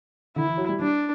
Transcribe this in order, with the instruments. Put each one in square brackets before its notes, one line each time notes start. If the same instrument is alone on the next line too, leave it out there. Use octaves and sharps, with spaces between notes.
[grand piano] D3 [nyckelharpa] E4
[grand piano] E3
F#3
G3
[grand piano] G3 [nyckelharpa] D4